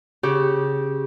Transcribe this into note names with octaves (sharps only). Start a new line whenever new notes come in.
C#3 G4